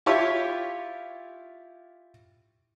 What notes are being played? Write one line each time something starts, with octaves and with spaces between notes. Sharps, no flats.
E4 F4 G4 C#5